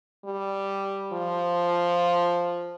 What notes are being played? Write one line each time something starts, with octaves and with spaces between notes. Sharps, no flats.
G3
F3